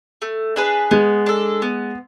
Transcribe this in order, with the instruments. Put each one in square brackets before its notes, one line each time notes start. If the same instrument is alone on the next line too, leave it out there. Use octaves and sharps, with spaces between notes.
[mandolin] A3
D4 G#4 B4
[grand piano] G#3 [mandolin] B3
[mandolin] D4 A4
B3